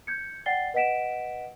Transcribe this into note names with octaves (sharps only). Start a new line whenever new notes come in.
G6 G#6 C#7
D5 F#5 G5 A6 C7 G7
B4 D#5 F#5 B6 D7 E7